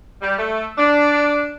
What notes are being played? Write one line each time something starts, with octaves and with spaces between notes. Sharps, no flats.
G3
A3
D4